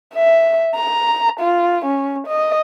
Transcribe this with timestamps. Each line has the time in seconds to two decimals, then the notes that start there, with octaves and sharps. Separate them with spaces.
0.15 E5
0.75 A#5
1.40 F4
1.85 C#4
2.27 D#5